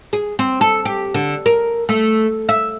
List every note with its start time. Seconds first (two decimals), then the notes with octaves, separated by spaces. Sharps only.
0.13 G#4
0.39 C4
0.61 A4
0.85 G4
1.14 D3
1.46 A#4
1.89 A3
2.49 E5